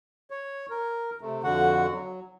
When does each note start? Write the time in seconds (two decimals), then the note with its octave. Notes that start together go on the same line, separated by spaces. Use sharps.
0.30 C#5
0.70 A#4
1.21 C3 A3
1.43 F2 D3 F#4 F#5
1.92 F#3